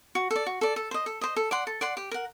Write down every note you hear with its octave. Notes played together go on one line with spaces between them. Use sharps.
F#4
A4 D5
F#4
A4 D5
A4
C5 D#5
A4
C5 D#5
A4
D5 F#5 C6
A4
D5 F#5 C6
G4
A#4 F#5